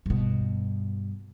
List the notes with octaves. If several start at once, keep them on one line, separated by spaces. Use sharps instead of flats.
G2 B2